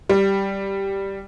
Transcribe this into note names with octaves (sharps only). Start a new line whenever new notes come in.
G3